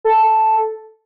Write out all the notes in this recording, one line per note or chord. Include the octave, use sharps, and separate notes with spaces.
A4